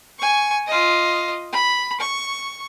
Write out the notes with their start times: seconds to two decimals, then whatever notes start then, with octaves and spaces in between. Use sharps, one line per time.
0.19 G#5 C#6
0.67 F4 D#5
1.53 B5
2.00 C#6